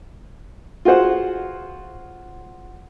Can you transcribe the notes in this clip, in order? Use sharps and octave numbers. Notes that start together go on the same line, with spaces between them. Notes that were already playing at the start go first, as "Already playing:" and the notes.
F4 F#4 G#4 C5 F#5